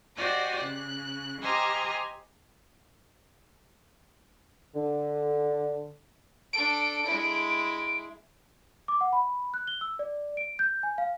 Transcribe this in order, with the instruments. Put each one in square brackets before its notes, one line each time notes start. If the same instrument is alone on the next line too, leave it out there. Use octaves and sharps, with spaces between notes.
[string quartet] F#4 G4 C5 D5 D#5
C#3 F#6
G4 C5 D#5 G#5 A#5 F6
[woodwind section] D3
[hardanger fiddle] D4 A4 [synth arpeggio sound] D7
[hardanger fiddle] G#3 E4
[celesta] D6
F#5
B5
F#6
G7
E6
D5
D7
G6
G#5
F5